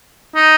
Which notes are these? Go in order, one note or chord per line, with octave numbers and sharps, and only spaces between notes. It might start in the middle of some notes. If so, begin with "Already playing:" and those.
D#4